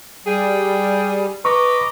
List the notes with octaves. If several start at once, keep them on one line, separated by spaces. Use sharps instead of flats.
G3 G#4 G5
B4 D#5 A#5 C#6 D6